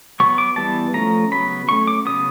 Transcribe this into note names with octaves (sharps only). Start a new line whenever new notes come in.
F#3 B3 C#6
D6
E3 G3 B3 A5
F3 A3 C#4 A#5
C#3 F#3 B3 B5
F#3 A3 C#4 C#6
D6
C#3 F#3 B3 D#6